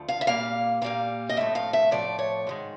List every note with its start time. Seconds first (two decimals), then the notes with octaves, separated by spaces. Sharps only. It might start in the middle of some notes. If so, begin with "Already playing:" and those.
Already playing: D2 F3 A3
0.08 F5
0.21 E5
0.27 A#2 G3 A#3 F5
0.82 A#2 G3 A#3 F5
1.29 D#5
1.37 A2 F3 A3 E5
1.55 F5
1.73 E5
1.91 A2 F3 A3 D5
2.19 C#5
2.47 G#2 D#3 G#3